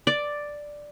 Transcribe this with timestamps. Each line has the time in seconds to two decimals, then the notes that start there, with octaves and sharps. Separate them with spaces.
0.07 D5